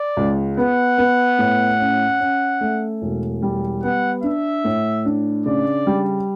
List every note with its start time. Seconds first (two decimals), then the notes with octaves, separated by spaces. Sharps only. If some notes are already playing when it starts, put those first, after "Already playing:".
Already playing: D5
0.17 C#2
0.57 B3 F#5
0.98 B3
1.39 A2
1.80 C#4
2.20 C#4
2.61 A3
3.02 E1
3.42 G3
3.83 B3 F#5
4.23 D4 E5
4.65 A2
5.05 D4
5.46 C#3 D5
5.87 G3